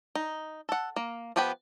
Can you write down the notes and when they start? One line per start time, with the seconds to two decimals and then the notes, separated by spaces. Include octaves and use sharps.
0.15 D#4
0.69 A4 F#5
0.96 A#3
1.36 F3 B3 G4 B4 G5